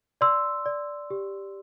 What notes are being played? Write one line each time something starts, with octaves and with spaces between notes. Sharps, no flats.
D5 C6 E6
D5
G4